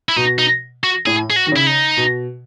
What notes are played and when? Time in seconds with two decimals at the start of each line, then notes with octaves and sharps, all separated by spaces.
0.09 E4
0.16 B2 D#4
0.38 D#4
0.84 F#4
1.06 A2 G#4
1.30 G#4
1.36 F#4
1.47 D#3
1.52 C#3 E4
1.67 D#4
1.97 B2